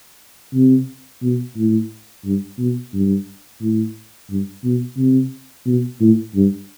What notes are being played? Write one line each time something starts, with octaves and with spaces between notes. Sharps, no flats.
C3
B2
A2
G2
B2
G2
A2
G2
B2
C3
B2
A2
G2